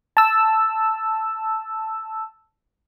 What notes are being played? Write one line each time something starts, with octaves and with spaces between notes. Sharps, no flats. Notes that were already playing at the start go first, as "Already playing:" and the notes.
A5 E6